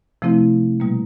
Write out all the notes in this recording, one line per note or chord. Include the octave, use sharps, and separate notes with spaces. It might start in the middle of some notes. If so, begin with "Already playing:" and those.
C3 F3 A3 C4 E4
B2 G3 A#3